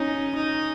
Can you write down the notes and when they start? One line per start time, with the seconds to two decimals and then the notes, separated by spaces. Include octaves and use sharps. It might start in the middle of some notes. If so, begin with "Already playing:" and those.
Already playing: C#4 D#4
0.35 D#4